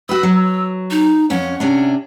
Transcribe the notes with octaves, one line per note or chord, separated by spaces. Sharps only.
F#4 B4 E6
F#3
D#4
F2 C#4 F#5
C3 C#4 D4